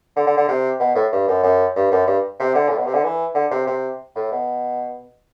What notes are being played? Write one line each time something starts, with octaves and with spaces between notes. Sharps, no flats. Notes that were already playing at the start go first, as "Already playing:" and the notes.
D3
D3
D3
C3
B2
A2
G2
F#2
F#2
G2
F#2
G2
C3
D3
A2
B2
C3
D3
E3
D3
C3
C3
A2
B2